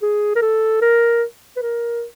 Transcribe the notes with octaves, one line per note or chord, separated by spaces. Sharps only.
G#4
A#4
A4
A#4
B4
A#4